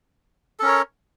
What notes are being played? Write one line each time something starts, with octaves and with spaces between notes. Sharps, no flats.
C#4 A4 A#4 C#5